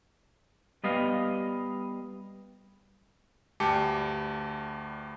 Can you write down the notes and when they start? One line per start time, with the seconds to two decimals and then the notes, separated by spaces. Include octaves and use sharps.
0.84 G3 B3 D#5 F5
3.60 D2 G2 G4 A5 D6 C#7